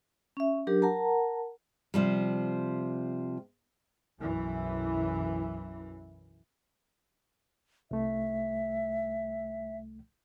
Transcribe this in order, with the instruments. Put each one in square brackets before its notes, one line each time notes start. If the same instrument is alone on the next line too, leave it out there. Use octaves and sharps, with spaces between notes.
[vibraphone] C#4 E5
F#3 D4 G4 A#4
A#4 F#5 A5 A#5
[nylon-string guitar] C3 F3 G3
[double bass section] B1 F#2 E3
[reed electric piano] C2 A3 [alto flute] E5